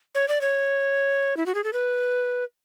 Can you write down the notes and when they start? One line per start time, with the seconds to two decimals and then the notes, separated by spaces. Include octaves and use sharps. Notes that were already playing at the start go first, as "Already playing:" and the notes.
0.15 C#5
0.28 D5
0.41 C#5
1.37 E4
1.46 F#4
1.55 G#4
1.64 A4
1.73 B4